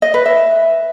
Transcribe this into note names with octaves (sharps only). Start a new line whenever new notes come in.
D#5
B4
E5